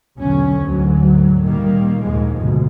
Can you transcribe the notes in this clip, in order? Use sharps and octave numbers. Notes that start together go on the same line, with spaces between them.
B1 E2 D3 F#3 C#4
D2 G#2 F#3
A#2 D#3 G3 A#3
A#1 D#2 G#2 F3 G#3
F1 D2 B2